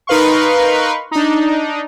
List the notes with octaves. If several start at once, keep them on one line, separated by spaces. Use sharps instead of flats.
D#4 A#4 B4 F5 C6 C#6
D4 D#4